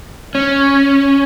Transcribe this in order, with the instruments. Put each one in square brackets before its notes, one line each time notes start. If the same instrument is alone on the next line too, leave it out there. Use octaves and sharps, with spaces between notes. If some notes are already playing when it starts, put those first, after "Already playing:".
[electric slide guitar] C#4